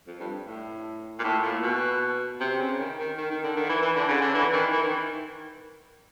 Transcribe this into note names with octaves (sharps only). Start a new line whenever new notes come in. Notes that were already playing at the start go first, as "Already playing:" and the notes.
F2
G2
A2
A#2
A2
A#2
B2
C3
C#3
D#3
D#3
D#3
D#3
D3
D#3
E3
E3
D3
C#3
D3
E3
D#3
E3
D#3